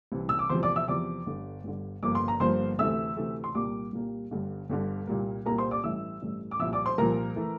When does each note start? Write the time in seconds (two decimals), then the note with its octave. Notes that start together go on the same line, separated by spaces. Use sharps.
0.12 C2 C3 E3
0.29 E6
0.39 D6
0.49 E2 C3 F3 C5 C6
0.63 D5 D6
0.76 E5 E6
0.88 E2 C3 F3 D5 D6
1.26 G1 G2 D3
1.64 G1 G2 D3
2.03 G1 G2 F3 A#3 D6
2.15 C6
2.28 A#5
2.40 G1 G2 F3 A#3 C5 C6
2.79 D2 C3 E3 A3 E5 E6
3.17 D2 C3 E3 A3
3.44 C6
3.55 C2 A#2 G3 A#3 D5 D6
3.93 C2 A#2 G3 A#3
4.31 G1 G2 D3
4.70 G1 G2 D3
5.07 C2 A#2 G3 A#3
5.45 C2 A#2 G3 A#3 A#4 A#5
5.58 C5 C6
5.71 D5 D6
5.84 A1 G2 E3 A3 E5 E6
6.22 A1 G2 E3 A3
6.51 D6
6.59 C2 A#2 F3 E5 E6
6.73 D5 D6
6.85 C5 C6
6.98 C2 A#2 F3 A#4 A#5
7.36 E3 A3